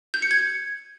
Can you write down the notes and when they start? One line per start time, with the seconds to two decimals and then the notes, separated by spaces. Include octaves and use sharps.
0.14 G6
0.22 C#7
0.31 G#6